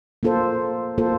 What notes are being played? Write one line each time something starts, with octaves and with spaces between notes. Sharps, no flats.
A#3 F4 A4 C5
A#3 F4 A4 C5